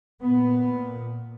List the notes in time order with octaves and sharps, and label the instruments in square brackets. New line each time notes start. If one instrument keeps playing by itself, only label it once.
[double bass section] A#2 B3